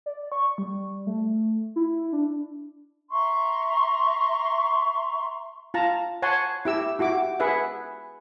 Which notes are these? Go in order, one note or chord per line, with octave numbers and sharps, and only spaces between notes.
D5
C#6
G3
A3
E4
D4
E5 A#5 C6 C#6
F4 A5 A#5
C#5 F#5 G#5 A5 C6
E4 G4 E6
E4 F#4 G4 D6
G#4 B4 E5 F#5